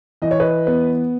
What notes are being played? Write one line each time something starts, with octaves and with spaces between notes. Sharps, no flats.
E3 D#5
C#5
B4 D#5
B3